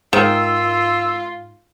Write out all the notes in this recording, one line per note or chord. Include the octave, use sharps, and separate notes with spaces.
G#2 D#3 F4 E6